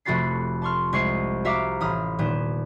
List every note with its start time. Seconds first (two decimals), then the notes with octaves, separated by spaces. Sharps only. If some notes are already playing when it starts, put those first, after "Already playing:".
0.05 F1 A3 F#4 B5 A6 C7
0.62 A5 C6 C#6 F6
0.93 C2 G#3 C#6 C7
1.45 F#4 E5 F5 A#5 D6
1.81 A1 B5 D#6 F6
2.19 D#1 B3 G6 E7